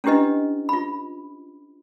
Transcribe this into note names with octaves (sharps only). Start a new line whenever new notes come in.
C#4 D4 E4 G4 B4 D#5
F4 B5